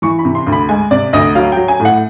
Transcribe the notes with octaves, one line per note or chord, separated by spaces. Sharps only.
E3 C#6
B5
C3
C6
D2
B5
G#3 G#5
C3 D5
D2 D#5
F#3 F5
F#3 G5
G#5
A2
F#5